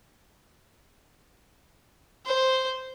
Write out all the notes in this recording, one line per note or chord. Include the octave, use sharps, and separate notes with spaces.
C5